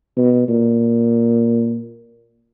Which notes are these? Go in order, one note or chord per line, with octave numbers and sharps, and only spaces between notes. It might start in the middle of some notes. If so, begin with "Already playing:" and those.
B2
A#2